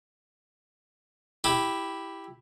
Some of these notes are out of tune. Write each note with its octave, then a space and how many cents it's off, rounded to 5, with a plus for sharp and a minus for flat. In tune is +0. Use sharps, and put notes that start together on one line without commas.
E4 +0 G4 +0